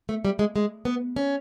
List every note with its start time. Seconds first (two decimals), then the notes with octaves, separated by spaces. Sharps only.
0.09 A3
0.25 G3
0.39 G#3
0.56 G#3
0.85 B3
1.16 C#4